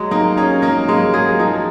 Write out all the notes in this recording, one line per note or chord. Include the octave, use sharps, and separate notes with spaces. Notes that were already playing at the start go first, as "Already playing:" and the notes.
Already playing: F#3 G#3
A#3 D#4
C#4 G#4
A#3 D#4
G#3 A#3
F#3 G#4
F3 D#4